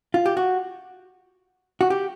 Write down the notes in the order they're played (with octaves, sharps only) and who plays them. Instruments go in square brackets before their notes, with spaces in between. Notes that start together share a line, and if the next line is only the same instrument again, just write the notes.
[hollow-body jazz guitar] F4
G4
F#4
F#4
G4